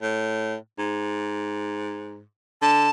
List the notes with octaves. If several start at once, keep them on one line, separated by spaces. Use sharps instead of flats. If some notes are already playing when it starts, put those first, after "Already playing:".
A2
G#2
D3 A5